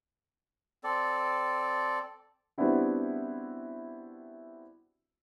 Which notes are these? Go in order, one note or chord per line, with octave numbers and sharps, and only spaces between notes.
C4 A4 D5
G3 B3 C4 D4 E4 F#4